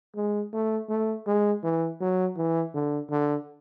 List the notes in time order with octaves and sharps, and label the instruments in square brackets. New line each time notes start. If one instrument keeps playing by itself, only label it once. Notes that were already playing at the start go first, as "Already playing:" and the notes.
[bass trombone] G#3
A3
A3
G#3
E3
F#3
E3
D3
D3